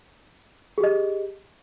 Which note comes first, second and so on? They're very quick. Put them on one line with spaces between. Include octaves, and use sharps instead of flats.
G#4 G4 D#5